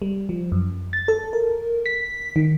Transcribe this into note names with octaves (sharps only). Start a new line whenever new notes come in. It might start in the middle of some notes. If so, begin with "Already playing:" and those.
G3
F3
F#2
A6
A4
A#4
B6
D#3